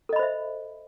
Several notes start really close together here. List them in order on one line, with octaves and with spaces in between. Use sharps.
A4 D#5 B5 C5 E5